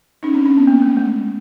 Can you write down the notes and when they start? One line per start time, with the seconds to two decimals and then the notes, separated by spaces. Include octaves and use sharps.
0.23 C#4 D#4
0.34 C4 D4
0.46 C#4
0.57 B3
0.67 A#3
0.82 A3
0.97 G#3